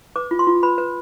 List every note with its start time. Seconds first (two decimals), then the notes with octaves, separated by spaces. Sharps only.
0.16 B4 D6
0.31 F4
0.39 C6
0.47 F4
0.63 B4 B5
0.78 B4